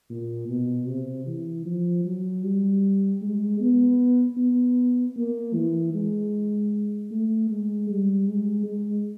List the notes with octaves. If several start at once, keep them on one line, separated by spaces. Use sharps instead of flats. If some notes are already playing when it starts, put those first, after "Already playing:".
A#2
B2
C3
E3
F3
F#3
G3
G#3
B3
B3
A#3
E3
G#3
A3
G#3
G3
G#3
G#3